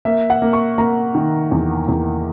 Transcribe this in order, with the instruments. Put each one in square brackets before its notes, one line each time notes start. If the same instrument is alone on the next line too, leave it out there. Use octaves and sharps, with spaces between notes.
[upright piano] A#3 E5
F#5
A#3
C#6
A#3 A#5
D#3
E2
E2